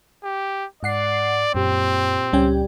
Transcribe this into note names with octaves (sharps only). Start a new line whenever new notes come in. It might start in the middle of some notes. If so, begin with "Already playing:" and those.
G4
G#2 D5 F#5 C7
F#2 A#2 C4 G4
C#2 G3 C#4 G5